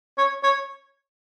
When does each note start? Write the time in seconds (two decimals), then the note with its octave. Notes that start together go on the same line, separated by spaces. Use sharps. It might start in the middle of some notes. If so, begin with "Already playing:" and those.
0.18 C#5
0.44 C#5